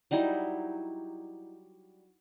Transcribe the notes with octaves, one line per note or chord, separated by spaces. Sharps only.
F#3 G3 D#4 E4